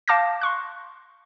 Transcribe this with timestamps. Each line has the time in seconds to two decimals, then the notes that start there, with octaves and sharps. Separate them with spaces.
0.08 F5 A5 D6 F6 G6 A#6
0.41 C6 C#6 F#6